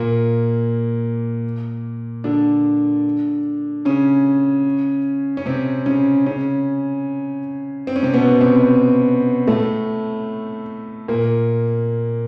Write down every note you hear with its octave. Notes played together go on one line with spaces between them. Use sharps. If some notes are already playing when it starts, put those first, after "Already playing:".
Already playing: A#2 A#3
D3 D4
C#3 C#4
C#4
C3 C4
C#3 C#4
C#3 C#4
C4
C#4
C3 C4
B2 B3
C3 C4
A2 A3
A#2 A#3